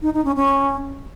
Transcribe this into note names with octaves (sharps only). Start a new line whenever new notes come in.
D#4
D#4
C#4
C#4